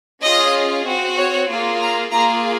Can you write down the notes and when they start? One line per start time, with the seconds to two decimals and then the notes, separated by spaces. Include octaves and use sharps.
0.23 C#4 F4 G#4 D#5
0.86 C4 F#4
1.18 C#5
1.49 A#3 F4 G#4
1.81 A#5
2.12 A#3 F4 G#4 A#5